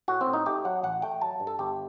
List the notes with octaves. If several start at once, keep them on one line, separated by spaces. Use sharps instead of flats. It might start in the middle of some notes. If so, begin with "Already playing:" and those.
A2 F#4
C4
A2
D#4
A3 G4
F#3 F#5
A1 F#5
A3 G5
F#3 A5
G2
A4
G1 G4